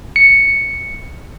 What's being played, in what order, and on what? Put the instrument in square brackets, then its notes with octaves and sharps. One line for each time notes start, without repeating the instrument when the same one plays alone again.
[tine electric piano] C#7